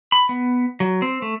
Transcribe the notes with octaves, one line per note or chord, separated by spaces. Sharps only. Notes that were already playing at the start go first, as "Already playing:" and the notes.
B5
B3
F#3
C4
A3